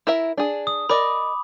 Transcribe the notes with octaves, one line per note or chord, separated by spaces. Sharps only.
E4 A#4 E5
D4 G#4
D#6
A#4 D5 D#5 B5 D6